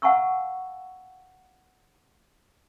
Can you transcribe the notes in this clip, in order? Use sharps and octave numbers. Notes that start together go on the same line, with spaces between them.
F5 F#5 G#5 A#5 C#6 E6